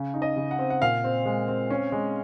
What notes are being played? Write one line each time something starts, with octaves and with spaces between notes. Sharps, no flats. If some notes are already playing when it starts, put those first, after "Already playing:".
Already playing: C#3
D#4
D#5
C#3
F#5
C4
F#5
A#2 F5
C4
G#3
C4
C#4
G#3